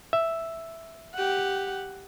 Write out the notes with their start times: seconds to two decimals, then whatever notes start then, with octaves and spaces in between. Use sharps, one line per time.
0.13 E5
1.15 G4 F#5